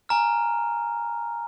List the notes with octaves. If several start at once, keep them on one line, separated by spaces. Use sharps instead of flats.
G#5 A#5 F6